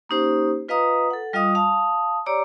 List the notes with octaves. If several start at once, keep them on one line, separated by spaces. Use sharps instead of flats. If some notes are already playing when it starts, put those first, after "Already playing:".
A#3 C#4 D#4 G4 C5
F4 B4 D#5 F5 A#5 D#6
A4 F#5
G3 F4 D#5 F5 D#6
F5 A5 D#6
G4 C#5 D5 A#5 D6 E6